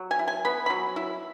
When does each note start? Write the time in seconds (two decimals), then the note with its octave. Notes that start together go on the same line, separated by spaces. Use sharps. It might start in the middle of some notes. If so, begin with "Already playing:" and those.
Already playing: F#3
0.11 G#5
0.19 E4
0.28 G#5
0.45 B3 B5
0.66 F#3 B5
0.96 E4